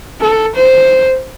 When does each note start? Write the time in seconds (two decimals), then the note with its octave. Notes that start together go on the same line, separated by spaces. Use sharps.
0.21 A4
0.56 C5